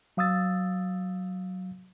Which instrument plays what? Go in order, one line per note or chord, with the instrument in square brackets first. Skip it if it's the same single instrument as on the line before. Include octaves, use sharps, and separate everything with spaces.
[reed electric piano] F#3 F5 D#6 E6 A6